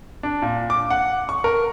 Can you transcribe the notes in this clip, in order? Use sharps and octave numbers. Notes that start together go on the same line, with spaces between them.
D4
A#2
D6
F#5
C#6
A#4